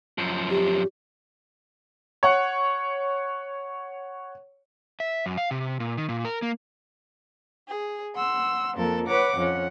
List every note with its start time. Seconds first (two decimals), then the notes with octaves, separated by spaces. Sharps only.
0.18 F#2 F3
0.50 G4
2.23 C#5 F#5
5.00 E5
5.26 F#2
5.37 F5
5.51 C3
5.80 A#2
5.97 D#3
6.09 A#2
6.25 A#4
6.42 A#3
7.68 G#4
8.15 F#5 C6 E6
8.76 F2 A#3 A4 A#4
9.07 B4 C#5 F#5 D6
9.37 F2 C#4 F#5